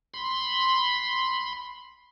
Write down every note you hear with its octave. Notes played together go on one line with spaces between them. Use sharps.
B5 C6